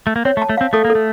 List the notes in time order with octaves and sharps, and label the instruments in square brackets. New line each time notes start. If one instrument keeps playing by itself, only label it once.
[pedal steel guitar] A3
A#3
[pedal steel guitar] C4 [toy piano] C#5
[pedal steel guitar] A3
[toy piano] A5
[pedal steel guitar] A3
[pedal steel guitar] C4 [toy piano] F5
[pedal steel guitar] A3 [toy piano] A4
[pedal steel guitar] A#3
[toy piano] A4
[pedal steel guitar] A3